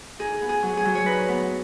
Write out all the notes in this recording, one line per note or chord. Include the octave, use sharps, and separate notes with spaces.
D#4 G#4
B3
G#4
F#3
G#4
F#3
C#5
D#4 B4
B3